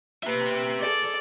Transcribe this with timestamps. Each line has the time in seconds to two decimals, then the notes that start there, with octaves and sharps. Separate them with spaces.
0.23 A#3 G4 B4 E5
0.80 G#4 A4 D5